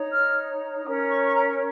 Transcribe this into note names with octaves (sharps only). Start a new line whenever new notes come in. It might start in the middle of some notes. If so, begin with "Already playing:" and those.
Already playing: D#4 C#5
F6
C#4 A#4 C#5 D#6
C#6
C#6
A#5